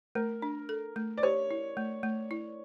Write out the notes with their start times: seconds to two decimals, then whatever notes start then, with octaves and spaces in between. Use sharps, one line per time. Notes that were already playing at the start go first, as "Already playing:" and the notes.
0.15 A3 A#4
0.42 D4
0.69 A4
0.96 A3
1.17 D5
1.23 G4 C#5
1.51 E4
1.77 A3
2.03 A3
2.31 E4